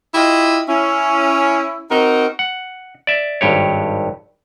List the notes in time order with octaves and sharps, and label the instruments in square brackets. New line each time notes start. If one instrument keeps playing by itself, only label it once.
[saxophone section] E4 F4 G4 D#5
C#4 E4
C4 D#4 F#4 A#4
[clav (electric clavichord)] F#5
D5 E5
G#1 G2 G4 C#5